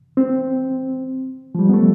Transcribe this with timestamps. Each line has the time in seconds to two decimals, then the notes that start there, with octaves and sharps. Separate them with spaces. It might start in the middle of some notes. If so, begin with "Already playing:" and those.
0.17 C4
1.55 F3
1.59 G3
1.69 B3
1.73 A3